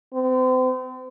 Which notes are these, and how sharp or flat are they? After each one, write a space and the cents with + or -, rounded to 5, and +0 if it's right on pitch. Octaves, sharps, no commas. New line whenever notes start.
C4 -35